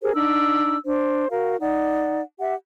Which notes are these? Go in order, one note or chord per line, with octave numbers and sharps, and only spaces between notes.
G4 G#4 A#4 C5
D4 D#4 E6
D4 C5
F#4 A#4 F5
D#4 D5 F#5
G4 E5 F#5